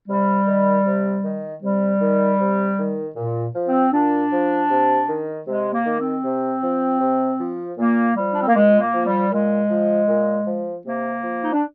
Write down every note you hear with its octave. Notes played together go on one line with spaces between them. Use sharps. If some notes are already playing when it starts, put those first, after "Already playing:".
C3 G3
D#3
C3
D#3
C3 G3
D#3
C3
D#3
A#2
F3
C4
A#2 D4
F3
C3
D#3
C3 G#3
A#3
D#3
C4
C3
F3
C3
F3
A#2 A#3
F3 G3
D4
C4
A#3
A#2 G#3
A#3
F3
G3
A#2 G#3
F3
A#2
F3
C3 A#3
F3
D#4
D4